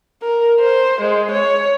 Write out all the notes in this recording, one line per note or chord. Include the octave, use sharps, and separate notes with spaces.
A#4
C5
G#3
C#5